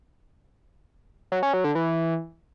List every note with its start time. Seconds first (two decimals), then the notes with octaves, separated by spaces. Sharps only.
1.32 F#3
1.43 C#4
1.54 F#3
1.64 D3
1.75 E3